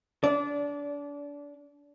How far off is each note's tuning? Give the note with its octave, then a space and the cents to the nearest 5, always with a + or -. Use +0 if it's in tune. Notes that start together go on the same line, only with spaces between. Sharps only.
D4 -30 D5 -20